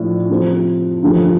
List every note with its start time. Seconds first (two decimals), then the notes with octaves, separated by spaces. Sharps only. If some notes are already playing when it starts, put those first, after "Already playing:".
Already playing: A2 F3 D4
0.30 C3 F3 C4 A4 C5
1.03 G2 D3 F3 A3